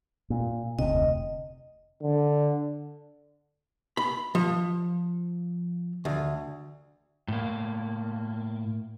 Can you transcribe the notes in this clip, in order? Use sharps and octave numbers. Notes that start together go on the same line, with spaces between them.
A#2
F1 D2 C3 D#5
D3
B5
F3
D2
A2 A#3